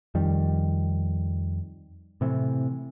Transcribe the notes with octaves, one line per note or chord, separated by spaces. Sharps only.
F2 D#3 G3
A2 C3 E3